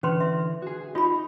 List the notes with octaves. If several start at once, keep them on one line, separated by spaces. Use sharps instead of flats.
D3 E3 C#4 B4 C6
E5
F#4 G#4
D#4 F4 G4 D#5 B5